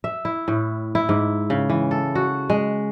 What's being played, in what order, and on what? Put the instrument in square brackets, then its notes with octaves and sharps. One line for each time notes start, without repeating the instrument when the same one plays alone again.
[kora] E5
E4
A2
E4
G#2
C#3
E3
A4
F#4
G#3